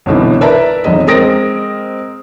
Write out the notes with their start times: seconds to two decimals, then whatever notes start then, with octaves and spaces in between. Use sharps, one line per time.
0.06 G1 C2 B2 D3 E3
0.41 A#4 B4 D5 E5 A5 A#5
0.84 E1 F2 D#3 G#3 D#5
1.07 G#3 C4 A#4 D#6 A#6 D7